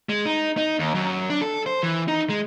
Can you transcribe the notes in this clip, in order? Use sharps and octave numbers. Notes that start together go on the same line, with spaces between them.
G#3
D#4
D#4
D#2
F#2
D4
A4
C5
E3
D#4
G#3